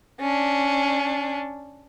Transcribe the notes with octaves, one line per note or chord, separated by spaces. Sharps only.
C#4 D4